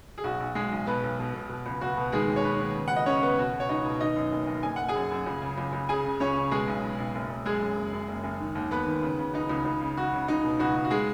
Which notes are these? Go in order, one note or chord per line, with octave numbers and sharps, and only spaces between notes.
G#4
B1 F#4
B1
B1 G#3 G#4
B1
B2 B3 B4
B1
B2
B2
B2
C#2
C#2 F#4
B2
D#3 G#3 G#4
D#2
C#5
D#3 B3 B4
D#2
C#3
C#2 F#5
D#5
C#3 C#4 C#5
C#3 B3 B4
B2 F#4
B2
C#5
C#2 D#4 D#5
B2
D#3 D#4 D#5
F#2
F#1
F#1
F#1 G#5
F#1 F#5
G#4 G#5
F#2
F#2
C#2
C#3
C#2
C#2
C#3 G#4 G#5
C#3
C#2 C#4 C#5
C#3
B2 G#3 G#4
B1
B1
B1
F#1
F#1
F#2 G#3 G#4
F#2
F#1
F#2
F#1
F#1
D#3
D#2
D#2 B3 B4
D#3
C#3
C#3
C#2 D#4
C#2
C#2
C#3
C#3 F#4
C#3
C#2 D#4
B2
C#2 F#4
C#2
F#4
G#3 G#4